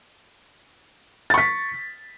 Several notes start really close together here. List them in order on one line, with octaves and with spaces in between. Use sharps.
A6 C#6 B6